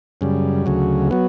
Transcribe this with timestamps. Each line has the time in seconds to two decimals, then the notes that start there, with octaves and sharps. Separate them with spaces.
0.21 F#2 C#3 G3
0.66 D2 C#3 F#3
1.11 F#3 B3